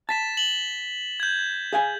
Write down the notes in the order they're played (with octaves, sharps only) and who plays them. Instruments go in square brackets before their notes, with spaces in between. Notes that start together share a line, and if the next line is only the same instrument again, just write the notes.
[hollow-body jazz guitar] A5 [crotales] A6 B6 E7
[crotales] F#7 G7
G6 G#6
[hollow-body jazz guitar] G#4 F5 G#5